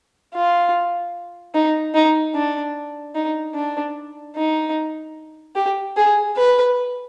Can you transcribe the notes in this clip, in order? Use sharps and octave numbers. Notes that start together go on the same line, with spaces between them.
F4
D#4
D#4
D4
D#4
D4
D#4
G4
G#4
B4